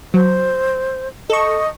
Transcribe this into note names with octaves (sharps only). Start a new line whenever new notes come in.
F#3 C5
A4 D#5 C#6